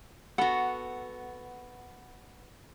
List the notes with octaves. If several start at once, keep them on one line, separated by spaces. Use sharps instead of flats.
B3 F#4 A4 F#5